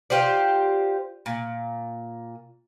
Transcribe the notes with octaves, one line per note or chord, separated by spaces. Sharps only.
F4 G4 C5 D5
A#2